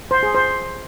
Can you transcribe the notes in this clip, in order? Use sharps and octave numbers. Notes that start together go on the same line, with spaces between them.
C5
G#4
C5